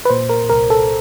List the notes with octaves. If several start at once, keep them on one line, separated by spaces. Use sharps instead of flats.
B4
A#2 C5
A#4
C2 A#4
A4